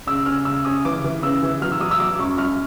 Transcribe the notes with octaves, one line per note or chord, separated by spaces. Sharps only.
C#3 E6
C#4 F6
C#3 E6
C#4 D#6
E3 D6
E3
C#3 E6
E3
F#3 F6
E6
F#3 D#6
E6
F#3 D6
F#2 C#6
F#2 F6